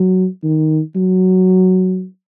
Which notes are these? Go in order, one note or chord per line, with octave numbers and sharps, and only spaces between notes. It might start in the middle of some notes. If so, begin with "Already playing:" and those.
Already playing: F#3
D#3
F#3